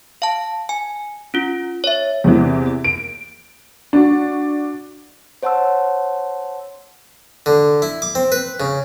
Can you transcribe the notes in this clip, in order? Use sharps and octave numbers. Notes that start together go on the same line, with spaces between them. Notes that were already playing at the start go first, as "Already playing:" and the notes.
F5 A5
G#5
C#4 F4
C#5 E5
E2 C3 E3
D7
D4 F#4
C5 C#5 F#5 A5 C6 E6
D3
E4
D6
C4
B4
C#3